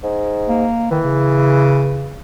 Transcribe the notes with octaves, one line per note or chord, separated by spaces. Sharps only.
G#2
A#3
D#3 E3
C#3